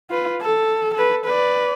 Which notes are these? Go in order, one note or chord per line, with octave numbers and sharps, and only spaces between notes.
F4 B4
A4
A4 B4
B4 D5